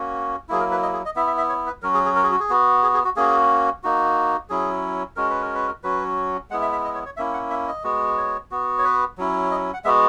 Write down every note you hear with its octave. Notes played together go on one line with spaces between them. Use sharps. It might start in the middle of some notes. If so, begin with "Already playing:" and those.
Already playing: A#3 C#4 F#4
F#3 A#3 E4 G#4
A#4
B4
D#5
G#4
D#5
B3 E4 E5
E5
E5
C#5
B4
F#3 C#4 F#4 A#4
G#4
G#4
A#4
G#4
F#4
G#4
B3 F#4
G#4
G#4
F#4
A#3 C#4 F#4 G#4
A#3 D#4 F#4
F#3 C#4 E4 G#4
G#3 C#4 F#4 A#4
B4
A#4
B4
A#4
F#3 C#4 F#4 B4
G#3 B3 E4 F#5
E5
E5
D#5
C#5
C#5
A#3 C#4 E4 E5
F#5
E5
D#5
G#3 B3 F#4
C#5
B3 F#4
C#5
B4
F#3 C#4 E4
D#5
F#5
G#3 B3 F#4 E5